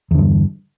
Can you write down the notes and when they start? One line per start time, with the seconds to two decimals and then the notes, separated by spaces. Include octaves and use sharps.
0.11 E2
0.15 D3
0.18 G2